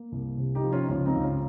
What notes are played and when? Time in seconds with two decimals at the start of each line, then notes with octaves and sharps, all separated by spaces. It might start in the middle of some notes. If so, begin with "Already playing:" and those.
Already playing: A#3
0.12 C2
0.38 C3
0.55 D#4 G4
0.63 F3
0.72 C#4 F4
0.83 D#4
0.89 C#2 C#4 F4
1.06 C4 D#4
1.15 C#2
1.23 C#4 F4